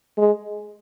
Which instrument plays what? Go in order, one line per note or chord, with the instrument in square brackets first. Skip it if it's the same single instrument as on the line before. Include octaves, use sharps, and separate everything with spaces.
[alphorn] G#3